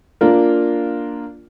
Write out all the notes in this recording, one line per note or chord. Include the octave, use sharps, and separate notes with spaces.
A#3 D4 F4 A#4